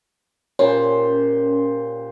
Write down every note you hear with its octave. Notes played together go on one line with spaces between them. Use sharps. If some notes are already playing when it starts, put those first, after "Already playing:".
A#2 C#4 G4 C5